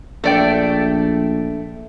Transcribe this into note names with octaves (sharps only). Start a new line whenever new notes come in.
A#1 A3 D5 G5